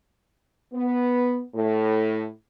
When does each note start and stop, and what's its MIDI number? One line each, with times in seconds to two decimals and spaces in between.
0.73 1.39 59
1.53 2.25 45